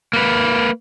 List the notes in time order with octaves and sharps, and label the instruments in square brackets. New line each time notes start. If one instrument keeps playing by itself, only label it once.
[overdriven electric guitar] A#3 B4